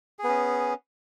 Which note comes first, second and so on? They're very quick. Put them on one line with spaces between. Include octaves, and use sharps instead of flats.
G#4 B3 C#4